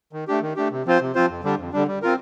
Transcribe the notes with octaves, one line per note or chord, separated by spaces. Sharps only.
D#3
A3 D4 G4
D#3
A3 D4 G4
C3
F3 C4 F4 C5
C3
F3 C4 F4 C5
F2
D3 G3 D4
F2
D3 G3 D4
G3
C4 F4 A#4